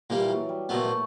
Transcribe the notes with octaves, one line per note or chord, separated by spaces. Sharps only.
A#2 E3 G3 A#3
F#3
G3
A#2 F#3 A3 B3
A3